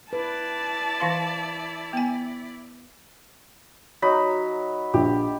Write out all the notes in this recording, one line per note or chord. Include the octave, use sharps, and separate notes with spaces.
E4 B4 D5 A5
E3 F5 C6
B3 G#5
F#3 D#4 B5
A#1 G4